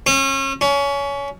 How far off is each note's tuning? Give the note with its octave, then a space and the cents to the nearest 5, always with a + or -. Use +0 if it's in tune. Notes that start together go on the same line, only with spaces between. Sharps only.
C#4 -35
C#4 +25